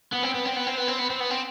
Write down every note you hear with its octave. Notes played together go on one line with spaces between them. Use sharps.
B3
C4
B3
C4
B3
C4
B3
C4
B3
C4
B3
C4